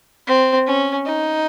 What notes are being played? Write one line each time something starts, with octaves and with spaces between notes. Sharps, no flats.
C4
C#4
D#4